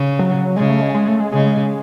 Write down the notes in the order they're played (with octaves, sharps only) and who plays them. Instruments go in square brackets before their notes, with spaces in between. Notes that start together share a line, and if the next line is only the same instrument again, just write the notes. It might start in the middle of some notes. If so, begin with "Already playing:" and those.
Already playing: [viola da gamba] C#3
[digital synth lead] F#3
[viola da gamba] C#3 [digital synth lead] G#3
[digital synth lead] A3
G#3
G#3
A3
G#3
[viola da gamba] C#3 [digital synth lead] G#3